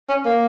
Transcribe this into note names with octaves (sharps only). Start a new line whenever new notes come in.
C#4
A#3